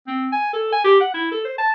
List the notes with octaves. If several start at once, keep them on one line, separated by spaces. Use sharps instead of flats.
C4
G#5
A4
G#5
G4
F#5
E4
A4
C5
A5